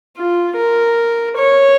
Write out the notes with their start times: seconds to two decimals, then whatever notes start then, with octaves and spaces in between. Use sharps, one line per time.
0.17 F4
0.57 A#4
1.37 C#5